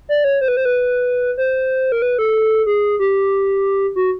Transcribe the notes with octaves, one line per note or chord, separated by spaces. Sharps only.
D5
C#5
C5
B4
C5
B4
C5
A#4
B4
A4
G#4
G4
F#4